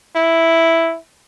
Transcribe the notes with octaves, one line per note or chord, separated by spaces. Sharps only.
E4